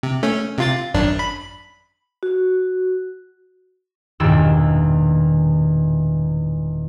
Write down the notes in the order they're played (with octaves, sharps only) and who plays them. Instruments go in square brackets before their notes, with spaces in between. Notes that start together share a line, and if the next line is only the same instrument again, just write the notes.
[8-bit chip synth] C3
A3 C#4
C3 F4 A6
G#1 F#2 D4
B5
[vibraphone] F#4
[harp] E1 E2 G2 A#2 D#3 E6